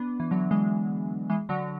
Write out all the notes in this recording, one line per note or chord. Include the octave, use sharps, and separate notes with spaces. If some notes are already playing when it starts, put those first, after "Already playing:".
Already playing: B3 D4
E3
D3 F#3
E3 G#3
E3 G#3
D3 F#3